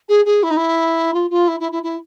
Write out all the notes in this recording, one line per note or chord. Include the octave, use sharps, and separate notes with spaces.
G#4
G#4
E4
D#4
E4
F4
F4
E4
E4
E4
E4